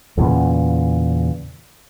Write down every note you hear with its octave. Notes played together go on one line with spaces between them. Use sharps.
E2 A#2 C#3